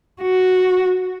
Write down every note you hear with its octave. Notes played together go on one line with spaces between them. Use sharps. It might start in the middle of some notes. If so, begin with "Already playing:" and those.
F#4